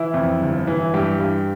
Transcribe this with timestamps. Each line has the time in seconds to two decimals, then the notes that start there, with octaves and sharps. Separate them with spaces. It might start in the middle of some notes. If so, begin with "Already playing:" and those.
Already playing: E3 E4
0.14 F2
0.41 G1
0.67 E3
0.94 G2 G4
1.20 G2